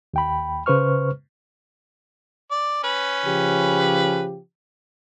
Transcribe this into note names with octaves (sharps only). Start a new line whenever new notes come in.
D#2 G5 B5
C#3 B4 C5 C#6 F6
D5
C#4 B4
C#3 F3 G4